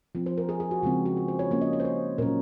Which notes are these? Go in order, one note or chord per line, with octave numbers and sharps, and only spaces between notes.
F3 C4
C5
A#4
G#4
G#4
F#4
C#3 F3 G#3 C4 F4
F#4
G#4
C5
C#5
F3 A#3 C#4 C#5
D#5
C#5
C5
C#5
A#2 F#3 C#4 A#4